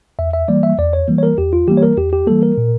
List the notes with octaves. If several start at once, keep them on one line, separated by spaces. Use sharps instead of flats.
E2 E5
E5
E3 G3 A#3 D5
E5
E2 D5
C#5
E3 G3 A#3
C#5
A#4
E2 G4
F4
E3 G3 A#3 G4
C#5
A#4
E2 G4
G4
E3 G3 A#3 A4
A#4
A#2